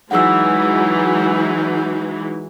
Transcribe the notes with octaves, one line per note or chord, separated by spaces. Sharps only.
E3 F#3 G#3 D#4 F#5 E6